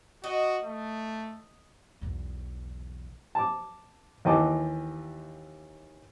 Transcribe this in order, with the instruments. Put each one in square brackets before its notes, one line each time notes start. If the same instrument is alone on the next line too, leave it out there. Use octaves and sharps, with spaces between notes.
[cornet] F#4 [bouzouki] D#5
[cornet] A3
[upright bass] B1 E2
[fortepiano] A5 D6
D#2 E3 D#5 G5 A5 D6